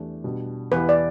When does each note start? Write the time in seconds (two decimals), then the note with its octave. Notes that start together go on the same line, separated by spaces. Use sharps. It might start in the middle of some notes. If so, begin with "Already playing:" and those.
Already playing: E2 E3 A3 D4 G4
0.24 B2 G3 D4
0.72 E2 E3 B3 E4 G4 B4
0.89 D5